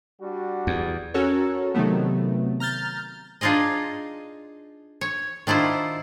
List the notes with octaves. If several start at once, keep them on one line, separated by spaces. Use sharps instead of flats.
G3 D4 F#4
E2
C#4 F#4 A4 A#4 C#5
C3 D#3 F#3 A3 B3
A#5 F6 G6 A6
D4 D#4 F4 G#4 D#5
C#5
D#3 D4 E4 F4 C5